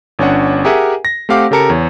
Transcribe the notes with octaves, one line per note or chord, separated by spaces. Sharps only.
G1 C#4 D4 F#5
G4 G#4 A#4 E5 F#5 G#5
A#6
A3 C4 G4 F5 F#5 D6
C#3 G4 A4 A#4 A5 C#7
E2 C#5